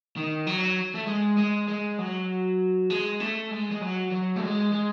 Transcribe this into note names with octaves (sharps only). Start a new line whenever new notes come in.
D#3
F#3
A3
G#3
G#3
G#3
F#3
G#3
A3
G#3
G#3
F#3
F#3
A3
G#3
G#3